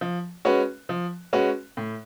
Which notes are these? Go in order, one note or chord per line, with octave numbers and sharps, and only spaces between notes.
F3
G#3 C#4 F#4 B4
F3
G#3 C#4 F#4 B4
A2